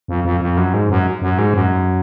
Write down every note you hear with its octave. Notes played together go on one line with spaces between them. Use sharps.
F2
F2
F2
F#2
G#2
F#2
F#2
G#2
F#2